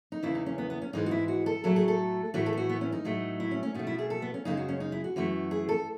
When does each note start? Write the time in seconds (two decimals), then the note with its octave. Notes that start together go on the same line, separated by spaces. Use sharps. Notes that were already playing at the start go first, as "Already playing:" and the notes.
0.12 D#4
0.23 E2 C#3 E3 E4
0.35 D#4
0.46 C#4
0.58 B3
0.70 B3
0.82 C#4
0.93 G#2 E3 G#3 D#4
1.06 F#4
1.11 E4
1.28 F#4
1.46 A4
1.64 A2 F#3 A3 A4
1.76 G#4
1.88 A4
2.34 A2 E3 A3 F#4
2.46 A4
2.53 G#4
2.57 F#4
2.69 B3
2.81 C#4
2.92 D#4
3.05 A2 F#3 A3
3.40 E4
3.51 C#4
3.63 C#4
3.74 B2 A3 D#4
3.87 E4
3.99 G#4
4.10 A4
4.22 B3
4.34 C#4
4.45 F#2 C#3 G#3 D#4
4.57 F#4
4.68 C#4
4.80 D#4
4.92 E4
5.04 F#4
5.16 F#2 E3 A3
5.51 G#4
5.69 A4